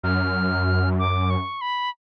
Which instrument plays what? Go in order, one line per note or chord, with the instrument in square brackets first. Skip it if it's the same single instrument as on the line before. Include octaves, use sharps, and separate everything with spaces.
[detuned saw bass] F#2 [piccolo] F6
[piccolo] D6
C#6
B5